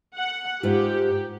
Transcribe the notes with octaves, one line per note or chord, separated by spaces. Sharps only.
F#5
G#2 F4 G4